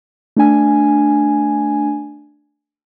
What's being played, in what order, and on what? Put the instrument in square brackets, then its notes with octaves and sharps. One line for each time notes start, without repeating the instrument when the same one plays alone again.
[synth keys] A3 D4 G#5